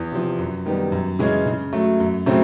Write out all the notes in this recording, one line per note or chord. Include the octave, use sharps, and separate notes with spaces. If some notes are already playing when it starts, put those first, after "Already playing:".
Already playing: E2
C3 F3
F#2
D#3 G3 B3
F#2
C#3 E3 G#3 C#4
C#3
F#3 A3
F#2
C#3 F#3 A3 C4